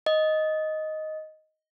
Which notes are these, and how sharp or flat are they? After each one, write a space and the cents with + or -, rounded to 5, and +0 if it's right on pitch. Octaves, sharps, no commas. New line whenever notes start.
D#5 +5